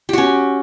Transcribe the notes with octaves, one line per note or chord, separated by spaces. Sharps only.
C#4 F#4 G4